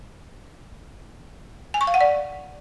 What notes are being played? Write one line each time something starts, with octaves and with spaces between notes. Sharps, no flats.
G#5
C#6
F5
F#5
D5